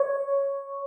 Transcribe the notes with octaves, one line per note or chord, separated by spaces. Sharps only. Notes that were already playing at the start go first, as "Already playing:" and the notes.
Already playing: C#5